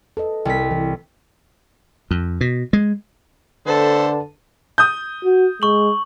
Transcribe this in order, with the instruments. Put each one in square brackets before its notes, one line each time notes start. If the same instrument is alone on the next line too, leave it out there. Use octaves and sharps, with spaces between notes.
[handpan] A4 B4 D#5
[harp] C2 B6
[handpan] E3
[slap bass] F2
B2
G#3
[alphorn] D3 [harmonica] A3 A4 C5 [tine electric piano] B4 A5
[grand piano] D#6 G6
[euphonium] F#4
[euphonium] G#3 [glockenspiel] C#6 F#7